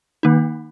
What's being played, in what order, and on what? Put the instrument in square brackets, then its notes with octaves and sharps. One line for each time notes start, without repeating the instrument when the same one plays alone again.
[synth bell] D#3 A#3 D#4